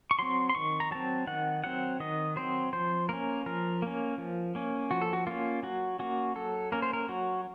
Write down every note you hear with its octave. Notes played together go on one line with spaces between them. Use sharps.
C#6
F#3 C4 C6
C6
D#3 C#6
A#5
F#3 C4 A5
D#3 F#5
F#3 C4 F#5
D#3 D#5
F#3 C4 C5
F3 C5
A#3 C#4 A#4
F3 A#4
A#3 C#4
F3
A#3 C#4
F3 F#4
A4
F#4
A#3 C#4 F4
F#3 F#4
A#3 C#4 F#4
F#3 A4
A#3 C#4 A#4
C5
A#4
F#3 F#4